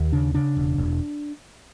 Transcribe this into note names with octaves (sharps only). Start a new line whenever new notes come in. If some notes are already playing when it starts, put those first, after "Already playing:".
Already playing: D#2
C#3 D4
C#3 D4
E1
E1